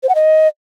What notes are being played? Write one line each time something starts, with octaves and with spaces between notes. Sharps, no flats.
C5
F#5
D#5